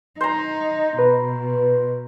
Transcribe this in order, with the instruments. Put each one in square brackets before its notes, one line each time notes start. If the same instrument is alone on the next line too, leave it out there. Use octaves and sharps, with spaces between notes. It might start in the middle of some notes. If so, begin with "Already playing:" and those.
[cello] D#4 [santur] C5 A#5
[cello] B2 [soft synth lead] B4